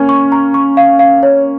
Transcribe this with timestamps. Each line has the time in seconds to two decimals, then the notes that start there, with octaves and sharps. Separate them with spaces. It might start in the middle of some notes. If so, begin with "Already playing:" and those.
Already playing: A#3 C#4
0.09 C#6
0.32 A#5
0.54 C#6
0.77 F5
0.99 F5
1.23 C#5